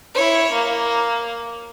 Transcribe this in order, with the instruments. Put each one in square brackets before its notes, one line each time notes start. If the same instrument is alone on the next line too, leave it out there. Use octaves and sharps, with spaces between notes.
[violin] E4 C#5
A#3